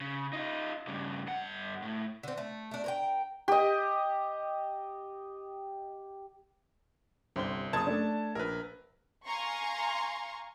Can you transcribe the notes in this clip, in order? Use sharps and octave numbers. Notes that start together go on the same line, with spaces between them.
C#3
D#4 F4
G2 C#3
G2 F#5
A2
D3 C4
A3
A3 D4
A#4 C#5 G5
G4 D#5
G1 C2 C5 G7
F#1 A5 D#6 G#6
A3 D4
A#1 A#4 B4
F5 G#5 A#5 C6 C#6